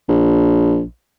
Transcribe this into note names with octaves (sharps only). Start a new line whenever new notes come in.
A#1